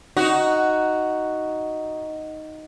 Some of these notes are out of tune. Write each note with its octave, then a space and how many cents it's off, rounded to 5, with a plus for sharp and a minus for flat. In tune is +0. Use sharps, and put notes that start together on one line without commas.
D#4 +0 F#4 +5